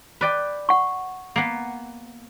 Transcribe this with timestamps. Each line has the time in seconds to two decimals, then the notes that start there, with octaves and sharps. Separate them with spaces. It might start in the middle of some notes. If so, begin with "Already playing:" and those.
0.21 B4 D5 G5
0.69 F#5 C#6
1.36 A#3 B3